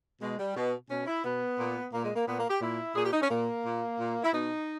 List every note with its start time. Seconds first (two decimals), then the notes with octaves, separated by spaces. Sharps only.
0.21 B2 G#3
0.39 G3
0.56 B2
0.90 B2 C#4
1.07 E4
1.24 B2 B3
1.59 A#2
1.93 A#2 A#3
2.04 G#3
2.16 A#3
2.27 A#2 B3
2.39 A#3
2.50 G4
2.61 A#2 E4
2.96 A#2 G#4
3.05 G4
3.13 D#4
3.22 C#4
3.30 A#2 A#3
3.64 A#2
3.99 A#2
4.24 E4
4.33 B2 D#4